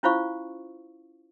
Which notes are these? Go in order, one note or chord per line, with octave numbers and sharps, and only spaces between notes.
C#4 E4 F4 C5 F5 C#6